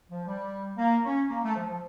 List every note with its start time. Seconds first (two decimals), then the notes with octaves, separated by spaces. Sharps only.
0.10 F3
0.27 G3
0.77 A#3
1.04 C#4
1.29 A#3
1.43 A3
1.54 F3
1.67 F3